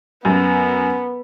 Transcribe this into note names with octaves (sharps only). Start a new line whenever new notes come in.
F#2 B3